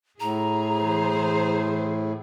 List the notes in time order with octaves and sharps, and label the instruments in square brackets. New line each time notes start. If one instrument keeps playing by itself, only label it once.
[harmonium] A2 [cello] G#4 [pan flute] A#5
[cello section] E3 C5